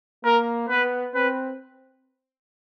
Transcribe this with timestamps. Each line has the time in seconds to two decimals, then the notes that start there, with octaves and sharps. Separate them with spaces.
0.24 A#3 A#4
0.69 B3 B4
1.14 C4 B4